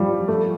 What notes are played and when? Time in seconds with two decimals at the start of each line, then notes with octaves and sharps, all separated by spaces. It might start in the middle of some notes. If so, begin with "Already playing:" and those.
Already playing: F3 G3
0.28 A3